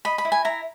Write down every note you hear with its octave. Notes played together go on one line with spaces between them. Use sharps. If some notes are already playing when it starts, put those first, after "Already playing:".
D#5 B5
B5
E4
G#5
E4 A#5